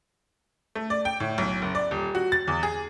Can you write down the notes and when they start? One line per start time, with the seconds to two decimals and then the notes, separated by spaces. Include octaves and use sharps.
0.75 A3
0.90 D5
1.05 G5
1.20 A2
1.38 B1
1.62 F#1
1.75 D5
1.91 D#1
2.15 F#4
2.32 A6
2.48 E2
2.63 G#4